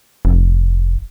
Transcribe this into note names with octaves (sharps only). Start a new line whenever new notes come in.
F1